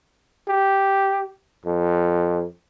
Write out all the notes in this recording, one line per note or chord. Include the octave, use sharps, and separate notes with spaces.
G4
F2